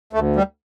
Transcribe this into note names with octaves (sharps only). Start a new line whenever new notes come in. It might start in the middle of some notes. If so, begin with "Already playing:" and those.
D2 A3
G3